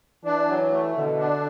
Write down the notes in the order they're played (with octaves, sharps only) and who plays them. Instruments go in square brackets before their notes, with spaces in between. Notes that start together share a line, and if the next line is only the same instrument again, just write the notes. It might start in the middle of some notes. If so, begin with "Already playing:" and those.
[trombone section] E3 [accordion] D4
[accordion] F#3
A3
[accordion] B2 [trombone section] D3
[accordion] D4